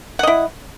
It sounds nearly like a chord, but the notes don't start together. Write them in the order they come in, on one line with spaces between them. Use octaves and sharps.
F#5 D#5 E4